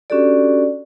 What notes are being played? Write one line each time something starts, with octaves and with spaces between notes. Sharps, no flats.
C#4 D4 F#4 G4 A4 D5